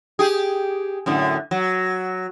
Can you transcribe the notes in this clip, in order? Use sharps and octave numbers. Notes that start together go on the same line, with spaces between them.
G4 G#4
F#2 A2 D3
F#3